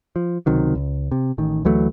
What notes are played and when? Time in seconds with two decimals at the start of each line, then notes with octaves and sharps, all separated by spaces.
0.16 F3
0.46 C#2 C3 D#3 F#3
0.75 C#2
1.12 C3
1.38 A1 D#3
1.65 D2 E3 F#3 A3